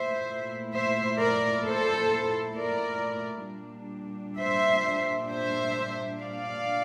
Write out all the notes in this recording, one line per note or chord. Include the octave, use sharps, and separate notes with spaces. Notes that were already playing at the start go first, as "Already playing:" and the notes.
Already playing: A#2 A3 E4 C5 E5
C5 E5
A#4 D5
A4 C5
A#4 D5
A#2 G3 D4
C5 E5
C5 E5
D5 F5